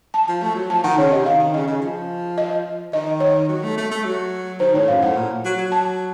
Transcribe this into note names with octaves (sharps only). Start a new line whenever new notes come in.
A5
F3
A3 A5
F#3
F3 A5
D#3 F#5
C#3 C#5
C3 D#5
D#3 F5
D#3
C#3 D#5
C#3
F3
D#5
D#3 D#5
C#5
F#3
A3
A3
A3
F#3
D#3 C5
A2 C#5
F#2 F5
A2 F#5
A#2
F#3
F#3
A5